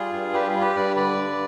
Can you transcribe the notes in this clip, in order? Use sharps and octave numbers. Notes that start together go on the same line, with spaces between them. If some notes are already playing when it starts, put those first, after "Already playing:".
Already playing: G3 F4 G#4
G2
G3 G4 B4
F4 G#4
G3
G4 B4
G2 B4 D5
D3 B4 D5
G2